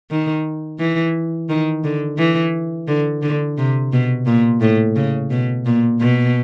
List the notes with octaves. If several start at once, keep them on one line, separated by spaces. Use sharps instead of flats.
D#3
E3
D#3
D3
E3
D3
D3
C3
B2
A#2
A2
C#3
B2
A#2
B2